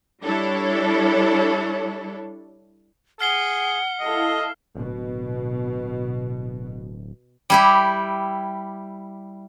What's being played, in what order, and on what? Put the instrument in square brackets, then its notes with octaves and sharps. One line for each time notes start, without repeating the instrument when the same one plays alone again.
[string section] G3 D4 E4 A4 C#5
[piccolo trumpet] G#4 [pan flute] F#5 [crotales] F6 C7 G7
[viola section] E4 A4 F5 [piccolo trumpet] D#5
[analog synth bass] D1 [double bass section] B2
[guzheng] G3 E4 G4